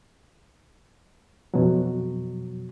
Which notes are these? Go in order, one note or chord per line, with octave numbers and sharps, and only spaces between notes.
F2 B2 F#3